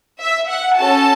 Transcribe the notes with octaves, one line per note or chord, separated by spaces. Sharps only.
E5
F#5
C#4 F#4 A4 A5